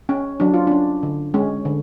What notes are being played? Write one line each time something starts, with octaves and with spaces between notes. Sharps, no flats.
C#4
F#3 D4
F4
C#4 D4
D3
G#3 C#4
D3